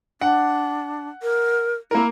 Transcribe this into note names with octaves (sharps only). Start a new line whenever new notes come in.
D4 F#5
A#4
A#3 E4 A#4